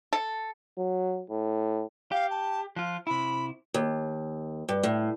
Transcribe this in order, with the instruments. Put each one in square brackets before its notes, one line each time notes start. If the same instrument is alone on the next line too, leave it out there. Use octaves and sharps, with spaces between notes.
[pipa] A4
[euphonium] F#3
A2
[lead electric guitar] G4 [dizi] F5
[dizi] A5
[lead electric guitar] F3 F4 [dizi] F#6
[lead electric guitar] C3 E4 [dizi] B5
[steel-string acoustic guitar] D#2
G2
A2